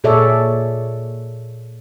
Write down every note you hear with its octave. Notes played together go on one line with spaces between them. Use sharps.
A#2 G#4 A4 C#5 D5 E5